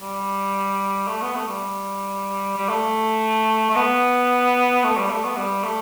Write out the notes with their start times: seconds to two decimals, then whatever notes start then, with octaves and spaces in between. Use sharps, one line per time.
0.01 G3
1.08 A3
1.22 B3
1.35 A3
1.49 G3
2.57 G3
2.69 A3
3.70 A3
3.76 B3
4.84 A3
4.98 G3
5.10 A3
5.24 B3
5.37 G3
5.64 A3